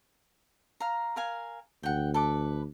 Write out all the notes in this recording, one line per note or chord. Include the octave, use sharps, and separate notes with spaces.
F5 A#5
A#4 F5 G#5
D2 F#5 G5
A4 B4 D6